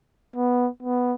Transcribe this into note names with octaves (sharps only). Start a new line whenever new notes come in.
B3
B3